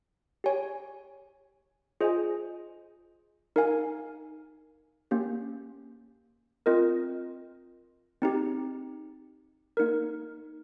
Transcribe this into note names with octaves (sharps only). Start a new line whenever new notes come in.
G4 C#5 G#5
F4 G#4 C5 D#5 G#5
D#4 A#4 F5 G#5
A#3 C#4 G4
C4 F4 A#4 D#5
C4 D#4 G4
A#3 D#4 A#4